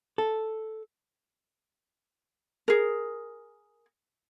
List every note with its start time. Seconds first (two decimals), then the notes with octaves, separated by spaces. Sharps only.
0.18 A4
2.68 G#4 A#4